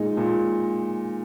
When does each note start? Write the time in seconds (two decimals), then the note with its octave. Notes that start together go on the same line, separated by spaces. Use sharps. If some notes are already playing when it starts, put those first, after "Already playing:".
Already playing: A#2 G#3 D#4
0.17 A#2